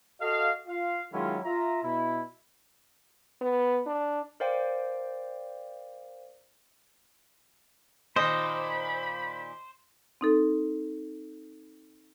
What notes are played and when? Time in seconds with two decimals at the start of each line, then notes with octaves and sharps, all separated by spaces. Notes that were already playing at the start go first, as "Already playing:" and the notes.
0.20 F#4 A4 D#5 F5
0.67 F4 F5
1.13 D#3 F#3 G#3 C#4 E4 F4
1.44 F4 E5 A#5
1.83 B2 E4
3.41 B3
3.86 D4
4.40 A#4 C5 D5 F5 G5
8.16 A#2 D#3 C5 D#5 B5
10.21 C4 D#4 A4